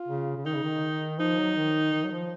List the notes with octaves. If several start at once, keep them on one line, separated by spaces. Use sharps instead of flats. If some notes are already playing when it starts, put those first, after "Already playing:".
Already playing: F4
C#3
C#3
D#3 D#4
C#3
D#3
F3 D#4
F#3
D#3
D#3
F#3
F3